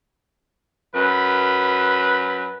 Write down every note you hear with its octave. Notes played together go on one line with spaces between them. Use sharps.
F#2 B4